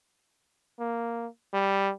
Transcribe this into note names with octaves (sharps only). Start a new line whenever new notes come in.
A#3
G3